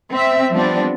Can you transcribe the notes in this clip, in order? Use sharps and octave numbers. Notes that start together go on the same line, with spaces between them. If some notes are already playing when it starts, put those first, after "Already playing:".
C4 E5
F3 G3 B3 C4 D4